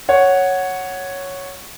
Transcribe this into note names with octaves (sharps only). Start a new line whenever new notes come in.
C#5 F#5